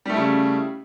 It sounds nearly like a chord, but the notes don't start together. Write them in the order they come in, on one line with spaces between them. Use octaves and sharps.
G3 A3 E4 C#3